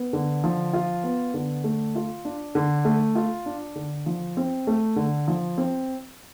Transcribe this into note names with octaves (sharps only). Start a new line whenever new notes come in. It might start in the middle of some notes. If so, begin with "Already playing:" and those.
Already playing: B3
D3
F3
F4
B3
D3
A3
F4
D4
D3
A3
F4
D4
D3
F3
C4
A3
D3
F3
C4